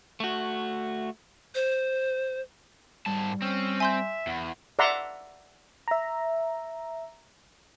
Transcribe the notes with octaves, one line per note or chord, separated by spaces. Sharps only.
A3 F#4
C5
G#2 G3 A5
C4 C#4
E5 G#5 C6 G6
E2 F#5
D5 E5 F#5 A#5 C6
E5 A#5